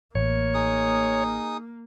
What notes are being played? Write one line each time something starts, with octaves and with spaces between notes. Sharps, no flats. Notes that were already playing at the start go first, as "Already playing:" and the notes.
A1 A#3 C#5
D#4 G#4 D#6